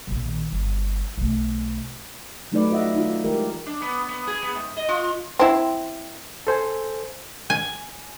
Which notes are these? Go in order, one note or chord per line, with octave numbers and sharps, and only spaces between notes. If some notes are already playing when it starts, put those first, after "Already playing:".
A#1 D#3
G1
B1 A3
F#3 A3 D#4 F#4 B4 D5
F4 D#5 E5 F#5
D#4 F4
E3 G#3 G4 A#4
D4
B3
B3
G#4
B3
G#2
D#5
F4
C4 E4
A4 C5 G#5
G#5